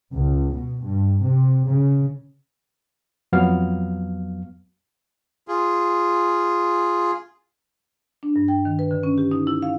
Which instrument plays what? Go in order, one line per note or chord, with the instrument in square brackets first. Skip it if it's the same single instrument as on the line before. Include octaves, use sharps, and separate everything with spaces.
[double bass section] C#2
B2
G2
C3
C#3
[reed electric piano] F2 F#3 B3 F5 F6
[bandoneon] F4 G#4
[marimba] D4
G2
G5
D#3
B4
D3
C#4
G4
D#4
E4
F5